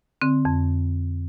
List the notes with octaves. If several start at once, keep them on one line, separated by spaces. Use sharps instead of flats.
D3 C4
F2